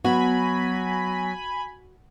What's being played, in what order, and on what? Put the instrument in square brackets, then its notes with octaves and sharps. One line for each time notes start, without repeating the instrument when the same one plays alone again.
[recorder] F#3 [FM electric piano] B3 [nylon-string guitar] F#4 [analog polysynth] G#5 B5